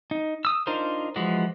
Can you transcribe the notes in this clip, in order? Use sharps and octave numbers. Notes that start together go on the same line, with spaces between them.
D#4
D#6 E6
D4 D#4 F4 A#4 C5
E3 F3 G#3 F#4